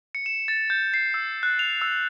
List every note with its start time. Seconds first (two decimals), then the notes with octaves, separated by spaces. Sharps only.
0.15 C#7
0.26 E7
0.48 A6
0.70 G6
0.94 C7
1.14 E6
1.43 F#6
1.59 F7
1.81 E6